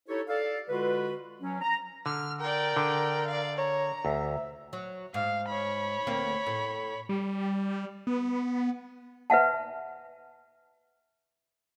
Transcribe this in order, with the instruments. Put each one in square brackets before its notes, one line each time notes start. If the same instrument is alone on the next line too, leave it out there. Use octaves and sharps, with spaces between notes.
[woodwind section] D#4 E4 G4 A4 C#5
A4 D5 F5
D3 G#3 F4 F#4 B4
F#3 C#4
A#5
[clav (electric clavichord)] D3 [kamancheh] F6
[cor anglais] A#4 [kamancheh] D5 G5
[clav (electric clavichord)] D3
[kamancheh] D5 F5
[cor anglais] C#5 [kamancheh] A#5
[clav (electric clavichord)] D2 [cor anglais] E5
[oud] F#3
[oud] G#2 [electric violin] F5
[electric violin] C#5 B5
[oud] D2 A#3 C4
A2
[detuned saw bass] G3
B3
[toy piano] B4 E5 F#5 A5